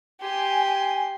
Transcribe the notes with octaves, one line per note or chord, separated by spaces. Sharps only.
G4 G#5 C6